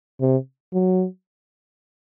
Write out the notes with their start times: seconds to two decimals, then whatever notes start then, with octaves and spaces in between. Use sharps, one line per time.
0.21 C3
0.73 F#3